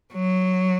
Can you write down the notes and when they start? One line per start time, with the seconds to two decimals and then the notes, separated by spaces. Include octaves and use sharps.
0.14 F#3